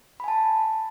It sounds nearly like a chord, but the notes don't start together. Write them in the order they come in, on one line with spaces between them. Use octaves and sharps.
B5 G#5 A5